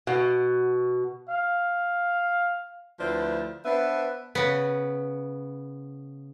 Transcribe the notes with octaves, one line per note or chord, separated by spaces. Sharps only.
B2
F5
D2 F3 E4 B4 C5 D5
B3 D4 B4 C5 E5
C#3 B3